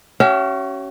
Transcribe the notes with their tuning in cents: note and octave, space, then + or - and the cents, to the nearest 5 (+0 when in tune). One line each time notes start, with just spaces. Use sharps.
C#4 +0 F#4 +45 E5 +30